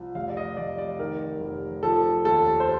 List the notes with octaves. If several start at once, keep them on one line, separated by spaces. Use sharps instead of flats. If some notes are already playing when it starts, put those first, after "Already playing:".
Already playing: C2 F3
F1 F5
D5
D#5
F1 D5
D5
D#3 A#4
F1
F3 A4
D#2 A4
C5